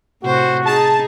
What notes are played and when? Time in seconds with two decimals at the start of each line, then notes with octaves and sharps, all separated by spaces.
0.23 A2 C3 F#4 C5
0.65 D#4 G#4 A5